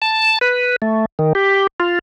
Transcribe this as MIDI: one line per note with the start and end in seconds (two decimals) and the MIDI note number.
0.02 0.39 81
0.41 0.76 71
0.82 1.05 57
1.19 1.33 51
1.35 1.67 67
1.80 1.99 65